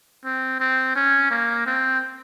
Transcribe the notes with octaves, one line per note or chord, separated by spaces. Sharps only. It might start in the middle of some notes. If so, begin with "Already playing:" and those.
C4
C4
C#4
A#3
C4